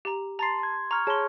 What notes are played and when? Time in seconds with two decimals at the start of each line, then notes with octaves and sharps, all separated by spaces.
0.05 G4 A#5
0.39 A5 A#5 C6 A6 C7
0.59 C6 G#6
0.91 A#5 C#6 F6 G#6
1.07 G#4 C#5 A5 C6 C#6